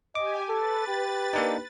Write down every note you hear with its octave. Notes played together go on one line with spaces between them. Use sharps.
G4 D#5 G#5 D6
A4 B4 A6
G4
A#3 D4 D#4